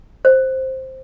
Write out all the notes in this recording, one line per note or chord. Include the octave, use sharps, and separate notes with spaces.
C5